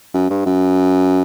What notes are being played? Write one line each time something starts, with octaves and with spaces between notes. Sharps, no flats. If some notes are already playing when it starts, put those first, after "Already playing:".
F#2
G2
F#2